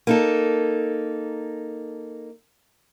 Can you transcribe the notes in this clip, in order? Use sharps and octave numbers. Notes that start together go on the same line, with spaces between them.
A#3 D#4 A4